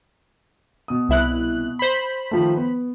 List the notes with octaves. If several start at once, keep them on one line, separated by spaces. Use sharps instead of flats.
B2 D#6
C2 E4 F#6
C5 B5
D#3 F3 A3
B3